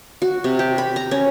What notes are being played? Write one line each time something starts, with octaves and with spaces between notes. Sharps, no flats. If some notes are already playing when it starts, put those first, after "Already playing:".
F#4
C3
G4
B5
A#5
C#4